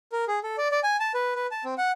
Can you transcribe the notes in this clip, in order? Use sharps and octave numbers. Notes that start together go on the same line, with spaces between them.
A#4
G#4
A4
D5
D5
G#5
A5
B4
B4
A5
C4
F#5